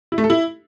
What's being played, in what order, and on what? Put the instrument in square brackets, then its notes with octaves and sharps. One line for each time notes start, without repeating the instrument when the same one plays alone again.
[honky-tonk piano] E4
A3
A4
E4